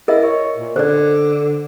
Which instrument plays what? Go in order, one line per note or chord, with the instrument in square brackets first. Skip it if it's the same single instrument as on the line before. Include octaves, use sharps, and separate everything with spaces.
[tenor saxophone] E4 [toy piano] A#4 D#5 E5
[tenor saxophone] C#5
A#2
[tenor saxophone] D3 [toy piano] C5 D5